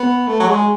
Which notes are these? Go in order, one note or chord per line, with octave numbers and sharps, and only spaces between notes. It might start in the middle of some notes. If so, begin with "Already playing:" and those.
Already playing: B3
A3
F#3
G#3